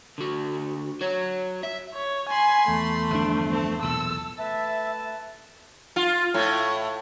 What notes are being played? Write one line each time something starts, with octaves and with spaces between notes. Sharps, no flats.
D3 F#4
F#4 C#5
E5
C#5
G#5 B5 C6
E2 A3
G1 F3 D4
C4 A4
B1 E2 A#2 A4 E6
A3 B4 E5 A5
F4
A2